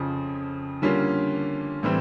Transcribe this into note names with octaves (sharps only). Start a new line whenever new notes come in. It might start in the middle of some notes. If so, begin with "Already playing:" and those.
Already playing: F2 C#3 F3
D3 G3 A#3 C#4 F4
A2 E3 G3 C4